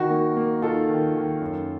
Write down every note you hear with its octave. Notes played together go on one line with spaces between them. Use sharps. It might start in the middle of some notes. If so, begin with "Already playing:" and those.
Already playing: D#3 D#4 F#4
A#3
A#3
D#4 F4 A4
D#3
D#3
F#2